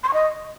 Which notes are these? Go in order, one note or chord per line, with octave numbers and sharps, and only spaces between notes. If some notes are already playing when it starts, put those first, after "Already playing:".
C6
C#6
D#5